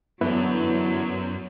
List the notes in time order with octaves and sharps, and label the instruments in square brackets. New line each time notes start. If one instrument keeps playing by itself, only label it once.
[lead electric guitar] F#2 [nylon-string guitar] D3 E3 D4 [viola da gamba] F#3 [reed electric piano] B3 E4 B4